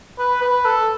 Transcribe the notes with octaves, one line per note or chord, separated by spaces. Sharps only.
B4
B4
A4